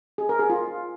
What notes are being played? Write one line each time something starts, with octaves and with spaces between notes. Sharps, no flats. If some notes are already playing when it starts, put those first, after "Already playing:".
G#4
A#4
G#4
F4